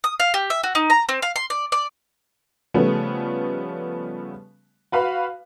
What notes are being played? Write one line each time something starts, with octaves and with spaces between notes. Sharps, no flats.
D#6
F5
G4
E5
F#4
D#4
A#5
C4
F5
C6
D5
D5
C#3 F3 G3 A3 B3 C#4
F#4 B4 F5 B5